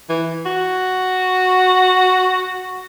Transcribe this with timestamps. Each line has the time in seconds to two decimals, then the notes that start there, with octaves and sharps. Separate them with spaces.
0.09 E3
0.46 F#4